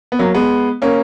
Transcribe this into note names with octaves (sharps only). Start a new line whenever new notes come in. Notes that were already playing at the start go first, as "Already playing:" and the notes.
B3
F#3 A#3
G#3 B3
A#3 C#4